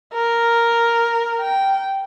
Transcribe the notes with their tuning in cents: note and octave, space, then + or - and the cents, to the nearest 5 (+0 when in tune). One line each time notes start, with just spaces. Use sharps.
A#4 +0
G5 -10